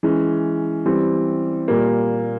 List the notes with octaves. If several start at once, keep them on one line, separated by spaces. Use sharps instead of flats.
E3 G#3 C#4
E3 G3 C4
A#2 G3 A#3